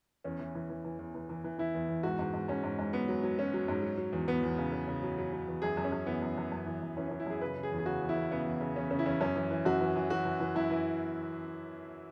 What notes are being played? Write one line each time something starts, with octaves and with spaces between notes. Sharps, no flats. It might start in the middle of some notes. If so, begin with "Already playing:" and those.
E2 C#4
E3
E3
E3
E3
E2
E3
E3
E3
E3 E4
E2
E2
G#2 F#4
G#2
G#2
G#2 C#4
G#2
G#2
F#3 B3
F#3
F#3
F#3 C#4
F#3
G#2
F#3
F#3
E2
E2 B3
E2
C#3
C#3
C#3
F#3
F#3
F#3
E2
F#2 G#4
F#2
C#4
F#2
E3 B3
F#2
F#2
F#2
E3
F#2
E3 C#4
E3 C#4
E4
F#2 G#4
C#3 B4
C#3
G#4
E2
G#4
C#3 F#4
E2
E4
E2
C#3 B3
E2
C#3
E2 C#4
C#3 C#4
E4
E2 C#4
F#2 C#4
E3
E3
F#2 F#4
E3
E3
E3 F#4
E3
E3
F#2 E4
E3